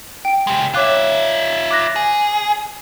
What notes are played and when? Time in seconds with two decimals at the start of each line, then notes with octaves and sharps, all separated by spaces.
0.25 G5 D7
0.47 G#3 G4
0.74 F4 C#5 E5 D6 F#6
1.71 D6 F#6 A#6
1.96 G#4